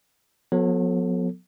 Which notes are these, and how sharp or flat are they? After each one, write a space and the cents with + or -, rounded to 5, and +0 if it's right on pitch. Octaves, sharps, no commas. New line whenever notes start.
F#3 -40 B3 +0 A4 +0